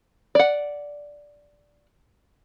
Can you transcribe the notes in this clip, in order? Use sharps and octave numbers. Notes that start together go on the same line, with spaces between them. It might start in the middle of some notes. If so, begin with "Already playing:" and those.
D5 F#5